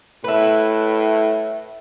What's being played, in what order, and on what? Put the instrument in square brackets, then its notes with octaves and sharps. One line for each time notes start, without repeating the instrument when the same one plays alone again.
[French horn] A2 [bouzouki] E4 B4